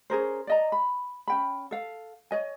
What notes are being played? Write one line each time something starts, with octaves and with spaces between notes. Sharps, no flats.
C#4 G#4 A#4 C5
D5 D#5 A#5
B5
C#4 G5 B5
A4 F5
C#5 D#5 G#5